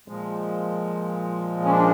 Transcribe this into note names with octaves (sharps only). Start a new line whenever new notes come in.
A#2 F3 G#3
C#4
D4